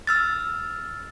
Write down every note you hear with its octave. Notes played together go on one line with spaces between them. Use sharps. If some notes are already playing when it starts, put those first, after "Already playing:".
E6 F6 A6